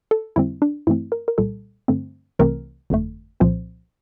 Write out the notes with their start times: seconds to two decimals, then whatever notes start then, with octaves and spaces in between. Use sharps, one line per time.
0.11 A4
0.36 F2 D3 G3 C4 E4
0.62 D4
0.87 G2 E3 A3 C4 E4
1.12 A#4
1.28 A#4
1.38 C2 A#2 G3 A4
1.88 G2 D3 A3 C4
2.39 C2 C3 E3 A3 C4 A#4
2.90 G1 F2 D3 A3
3.40 C2 A#2 F3 C4 C5